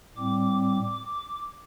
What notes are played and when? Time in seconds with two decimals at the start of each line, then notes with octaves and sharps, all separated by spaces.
0.17 A2 G3 C4 D6